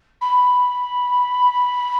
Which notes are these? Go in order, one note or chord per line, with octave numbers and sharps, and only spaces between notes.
B5